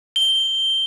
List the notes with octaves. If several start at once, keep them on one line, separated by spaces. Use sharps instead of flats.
G7